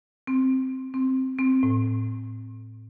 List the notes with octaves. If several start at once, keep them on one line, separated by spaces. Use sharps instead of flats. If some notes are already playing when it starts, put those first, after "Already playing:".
C4
C4
C4
A2